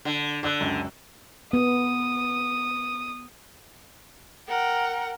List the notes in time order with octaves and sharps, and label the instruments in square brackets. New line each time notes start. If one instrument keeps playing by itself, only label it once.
[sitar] D3
[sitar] D3 [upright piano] D5 E6 F#6
[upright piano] C#2 F#2
[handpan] B3 [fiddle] D#6
[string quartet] A#4 F#5 G5